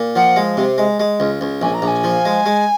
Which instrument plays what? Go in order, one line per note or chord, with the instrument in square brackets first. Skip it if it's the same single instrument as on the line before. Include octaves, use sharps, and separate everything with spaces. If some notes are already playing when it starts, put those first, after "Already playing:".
Already playing: [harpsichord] A#2
[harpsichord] F3 [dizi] F#5
[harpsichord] G#3
C3
G#3
G#3
C#2
C#2
[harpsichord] A#1 [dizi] G#5
[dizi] A#5
[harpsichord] A#1
[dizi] G#5
[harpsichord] F3
G#3
G#3